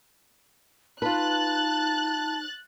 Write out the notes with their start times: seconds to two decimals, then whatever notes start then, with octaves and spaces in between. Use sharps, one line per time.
1.02 D#4 F4 B4 A5 F#6 A6